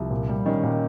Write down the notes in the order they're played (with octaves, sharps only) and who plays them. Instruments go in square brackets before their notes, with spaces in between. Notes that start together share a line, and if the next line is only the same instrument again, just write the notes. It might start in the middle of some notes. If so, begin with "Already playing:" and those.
Already playing: [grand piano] C2 [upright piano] F3
[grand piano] A#2
G3
[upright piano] D#3 [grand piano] C#4
[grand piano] A#2